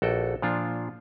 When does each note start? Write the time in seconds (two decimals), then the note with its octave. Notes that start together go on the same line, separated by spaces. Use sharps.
0.02 A#1 F#4 A4 G5
0.42 A#2 F3 D4 F4